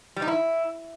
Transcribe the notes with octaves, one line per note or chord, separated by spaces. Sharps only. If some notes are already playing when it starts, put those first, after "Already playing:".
G3
D#4
E4